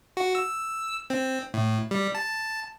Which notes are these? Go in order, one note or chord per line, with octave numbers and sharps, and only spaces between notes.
F#4
E6
C4
A2
G3
A5